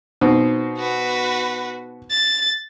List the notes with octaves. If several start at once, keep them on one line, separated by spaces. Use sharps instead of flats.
B2 C4 D#4
F#4 B4
A6